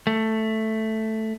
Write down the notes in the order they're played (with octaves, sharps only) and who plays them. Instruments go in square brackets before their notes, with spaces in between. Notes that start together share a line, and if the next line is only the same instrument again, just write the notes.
[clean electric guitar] A3